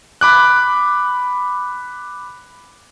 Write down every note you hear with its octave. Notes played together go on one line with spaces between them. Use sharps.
B5 D6 F#6